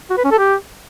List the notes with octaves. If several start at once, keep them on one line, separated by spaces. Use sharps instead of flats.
F#4
B4
C#4
A4
G4